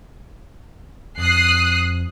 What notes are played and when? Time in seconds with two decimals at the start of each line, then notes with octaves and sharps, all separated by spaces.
1.18 F2 D#6 F#6 C7